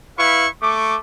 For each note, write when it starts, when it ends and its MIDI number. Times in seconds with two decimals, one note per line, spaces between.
0.18 0.47 64
0.18 0.47 71
0.18 0.47 77
0.18 0.47 85
0.61 0.97 57
0.61 0.97 85
0.61 0.97 86